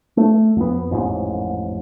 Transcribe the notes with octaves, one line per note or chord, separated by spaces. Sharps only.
A3
F2 B3
A1 F2 G#2